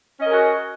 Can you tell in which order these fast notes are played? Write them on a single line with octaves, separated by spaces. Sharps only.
C#4 D#5 A#4 G#4 F#4